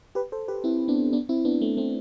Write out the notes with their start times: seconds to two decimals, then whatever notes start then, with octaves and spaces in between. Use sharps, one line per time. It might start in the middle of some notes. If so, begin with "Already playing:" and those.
0.15 G4 B4
0.32 A4 C5
0.48 G4 B4
0.64 C4 E4
0.88 B3 D4
1.13 B3 D4
1.29 C4 E4
1.45 B3 D4
1.61 A3 C4
1.77 A3 C4